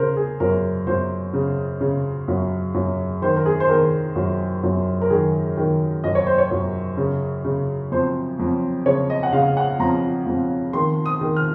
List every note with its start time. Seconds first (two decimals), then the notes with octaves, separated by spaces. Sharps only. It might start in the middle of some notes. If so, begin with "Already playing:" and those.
Already playing: C#3 A#4 C5
0.17 G#4
0.40 F#2 A#4
0.87 F#2 C5
1.33 C#3
1.81 C#3
2.28 F#2
2.74 F#2
3.22 D#3 C5
3.36 A#4
3.46 G#4
3.60 C5
3.69 D#3 A#4
4.16 F#2
4.63 F#2
5.01 A#4
5.10 D#3 G#4
5.57 D#3
6.04 F#2 D#5
6.15 C#5
6.27 C5
6.38 C#5
6.51 F#2
6.97 C#3
7.45 C#3
7.91 F2 C5
8.39 F2
8.85 C#3 C#5
9.10 D#5
9.23 F#5
9.33 C#3 F5
9.57 F#5
9.79 F2 A#5
10.27 F2
10.73 D#3 C6
11.06 D#6
11.21 D#3
11.36 F6